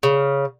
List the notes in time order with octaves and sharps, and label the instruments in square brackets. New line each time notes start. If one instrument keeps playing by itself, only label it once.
[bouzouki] C#3